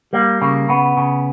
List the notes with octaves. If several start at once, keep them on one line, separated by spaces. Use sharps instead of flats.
G3 A#3
C#3 A#3
C#3 B3
C#3